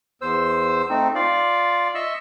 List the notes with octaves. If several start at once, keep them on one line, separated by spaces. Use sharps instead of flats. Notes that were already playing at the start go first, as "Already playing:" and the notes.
E2 C5 E6
A3 C4 D#4
F4 D5 F5
D#5 E5 C#6 E6